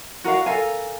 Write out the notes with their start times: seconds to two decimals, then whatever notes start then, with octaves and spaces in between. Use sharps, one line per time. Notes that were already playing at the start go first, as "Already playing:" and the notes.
0.24 F#4 A#4 D#5 F5
0.46 A4 A#4 F5 G#5